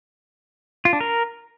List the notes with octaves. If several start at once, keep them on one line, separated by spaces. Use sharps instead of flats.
F4
D4
A#4